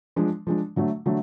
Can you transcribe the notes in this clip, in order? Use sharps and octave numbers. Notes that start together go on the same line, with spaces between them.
F3 G#3 D4
F3 G#3 D4
D3 F#3 A3
D3 F#3 A3